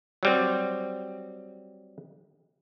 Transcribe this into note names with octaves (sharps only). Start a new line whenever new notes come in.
F#3 G3 C4